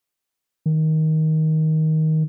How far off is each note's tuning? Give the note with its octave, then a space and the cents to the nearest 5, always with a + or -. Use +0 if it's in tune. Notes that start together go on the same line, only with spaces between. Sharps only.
D#3 +15